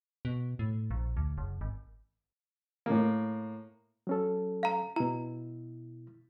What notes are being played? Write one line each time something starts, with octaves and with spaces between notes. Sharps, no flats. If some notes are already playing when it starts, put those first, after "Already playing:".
B2
A2
A#1
D2
F#1
G#1
A2 A#3
F#3 C#4 A4
F5 A#5
B2 E4 A#5